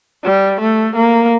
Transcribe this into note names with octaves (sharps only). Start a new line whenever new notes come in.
G3
A3
A#3